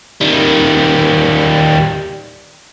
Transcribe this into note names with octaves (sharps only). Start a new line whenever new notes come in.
D#3 G3